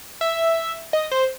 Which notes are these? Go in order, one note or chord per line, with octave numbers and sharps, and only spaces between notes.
E5
D#5
C5